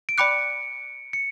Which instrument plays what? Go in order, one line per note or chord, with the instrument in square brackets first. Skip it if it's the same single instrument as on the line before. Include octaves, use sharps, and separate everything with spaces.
[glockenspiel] D7
[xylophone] D5 G5 B5 D6 F#6 [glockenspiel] C#7
[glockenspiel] C#7